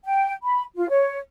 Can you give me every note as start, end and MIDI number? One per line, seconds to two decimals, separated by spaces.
0.05 0.33 79
0.43 0.63 83
0.76 0.86 65
0.89 1.18 73